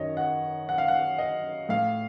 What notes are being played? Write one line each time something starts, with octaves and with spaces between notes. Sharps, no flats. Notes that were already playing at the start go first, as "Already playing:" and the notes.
Already playing: F#2 D#3 C#5 D#5
F#5
F#5
F5
F#5
D#5
A2 F5